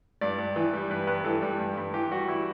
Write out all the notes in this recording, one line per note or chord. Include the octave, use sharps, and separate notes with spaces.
G2 D5
G2
E3
G3
G2 B4
G2 B4
E3 A4
G3
G2
G2
E3 G4
G3 F#4
E4